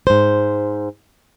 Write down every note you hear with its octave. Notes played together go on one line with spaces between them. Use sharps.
G#2 C5